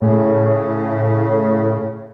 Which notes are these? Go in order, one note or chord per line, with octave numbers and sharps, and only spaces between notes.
A2 C#3